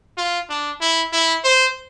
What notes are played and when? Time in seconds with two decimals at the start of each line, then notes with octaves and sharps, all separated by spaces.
0.17 F4
0.49 D4
0.81 E4
1.13 E4
1.44 C5